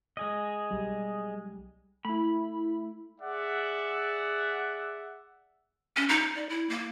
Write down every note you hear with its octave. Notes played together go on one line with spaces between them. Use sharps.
G#3 G#4 D#5
B1 G3
A3 E4 B5
G#4 D5 E5 F#5
C#4
D#4
D5
E4
A#3